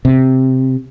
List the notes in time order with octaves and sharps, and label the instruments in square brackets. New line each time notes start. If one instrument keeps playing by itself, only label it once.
[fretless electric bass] C3